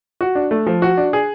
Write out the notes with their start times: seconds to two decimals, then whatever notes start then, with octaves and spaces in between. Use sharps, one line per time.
0.21 F#4
0.35 D4
0.51 A3
0.67 F3
0.82 F#4
0.97 D4
1.13 G#4